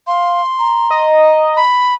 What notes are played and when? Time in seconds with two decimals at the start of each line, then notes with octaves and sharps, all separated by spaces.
0.07 F5 C6
0.59 A#5
0.90 D#5
1.57 B5